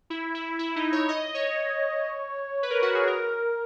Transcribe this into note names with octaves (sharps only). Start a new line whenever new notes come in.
E4
E4
E4
D#4
C#5
D#5
C#5
B4
A#4
F#4
G#4
A#4